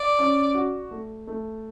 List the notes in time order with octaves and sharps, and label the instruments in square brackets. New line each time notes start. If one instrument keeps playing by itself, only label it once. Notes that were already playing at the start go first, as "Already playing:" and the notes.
Already playing: [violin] D5
[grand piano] C#4
F#4
A3
A3